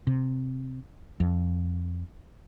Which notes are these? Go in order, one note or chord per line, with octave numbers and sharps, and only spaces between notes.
C3
F2